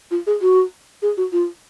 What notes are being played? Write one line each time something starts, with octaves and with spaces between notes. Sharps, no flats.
F4
G#4
F#4
G#4
F#4
F4